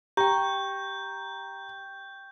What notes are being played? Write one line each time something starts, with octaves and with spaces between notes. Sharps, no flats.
G4 G5 A#5 C#6 G6